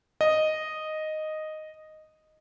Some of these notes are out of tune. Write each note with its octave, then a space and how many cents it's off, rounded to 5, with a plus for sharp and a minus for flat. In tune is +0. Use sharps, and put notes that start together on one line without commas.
D#5 -5